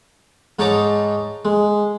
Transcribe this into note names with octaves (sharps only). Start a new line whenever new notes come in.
G#2 D#4 C#5 A5 A#5 D6
G#3